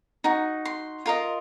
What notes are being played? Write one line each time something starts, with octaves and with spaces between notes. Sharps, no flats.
D#4 F#4
C6
F4 A#4 D#5